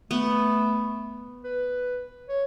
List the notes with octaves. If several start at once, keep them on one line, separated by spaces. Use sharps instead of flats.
A3 B3
B4
C#5